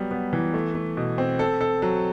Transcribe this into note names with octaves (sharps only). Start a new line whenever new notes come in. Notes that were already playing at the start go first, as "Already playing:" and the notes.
Already playing: F#3 G3 B3
B3
E3
A3
A3
B2
C4
A4
A4
F#3